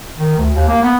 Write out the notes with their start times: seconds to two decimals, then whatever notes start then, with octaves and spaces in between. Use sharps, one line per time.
0.18 D#3
0.37 D2
0.55 D#2
0.68 A#3
0.82 B3